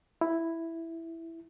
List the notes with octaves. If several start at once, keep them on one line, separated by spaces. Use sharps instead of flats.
E4